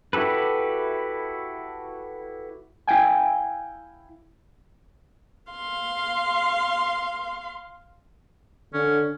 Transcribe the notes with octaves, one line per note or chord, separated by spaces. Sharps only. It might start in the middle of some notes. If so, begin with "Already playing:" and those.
E4 F#4 G4 A4 B4
E4 F5 G5 G#5
F5 C6
D3 C#4